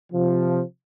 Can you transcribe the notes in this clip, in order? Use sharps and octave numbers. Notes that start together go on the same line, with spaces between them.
C3 F3